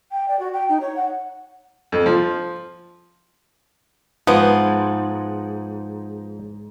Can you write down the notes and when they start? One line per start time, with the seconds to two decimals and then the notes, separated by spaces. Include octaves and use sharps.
0.12 G5
0.28 D5
0.39 F#4
0.54 G5
0.69 D#4
0.81 C#5
0.96 F#5
1.92 F2
2.06 F3
4.27 G#2 F3 B3